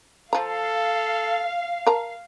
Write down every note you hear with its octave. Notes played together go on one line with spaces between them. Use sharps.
F3 A4 F5 A#5
A#4 A5 A#5